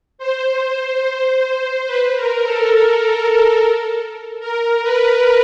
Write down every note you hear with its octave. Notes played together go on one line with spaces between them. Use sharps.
C5
B4
A#4
A4
A#4
A#4
B4